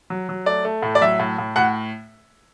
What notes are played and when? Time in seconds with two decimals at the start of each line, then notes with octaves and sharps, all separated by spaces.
0.10 F#3
0.29 F#3
0.46 A3 D5
0.65 A3
0.83 A2
0.95 D5
1.01 F#3 E5
1.20 A2
1.38 A2
1.56 A2 F#5